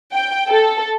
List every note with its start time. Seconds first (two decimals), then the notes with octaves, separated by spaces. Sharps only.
0.14 G5
0.50 A4